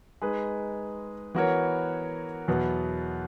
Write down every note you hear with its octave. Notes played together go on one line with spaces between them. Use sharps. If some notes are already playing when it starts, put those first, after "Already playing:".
G#3 D#4 G#4 B4
E3 B3 F#4 A#4 C#5
E2 B2 F#3 B3